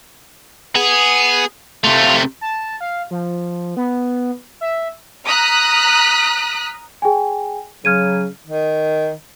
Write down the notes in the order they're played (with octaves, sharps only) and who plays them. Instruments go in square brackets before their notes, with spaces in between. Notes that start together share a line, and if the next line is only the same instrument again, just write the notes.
[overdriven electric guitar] B3 [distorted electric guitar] G#4
[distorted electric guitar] C3 A3 [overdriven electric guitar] F4
[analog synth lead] A5
F5
F3
B3
E5
[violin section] A#5 D#6 F6 F#6 B6
[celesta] G#4 G5 G#5
[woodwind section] C#3 F#3 [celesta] F6 G#6 D#7
[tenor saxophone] D#3